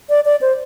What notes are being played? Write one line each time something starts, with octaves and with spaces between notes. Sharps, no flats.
D5
D5
C5